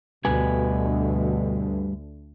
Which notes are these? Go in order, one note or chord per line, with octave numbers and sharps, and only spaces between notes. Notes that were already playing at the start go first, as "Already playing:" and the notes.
D2 G2 B2 D3 B4 G#5